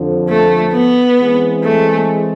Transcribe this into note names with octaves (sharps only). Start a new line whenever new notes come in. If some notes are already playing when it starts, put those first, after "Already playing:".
Already playing: F2 D3 F3
A3
B3
E3 G#3 C4 G#4
A3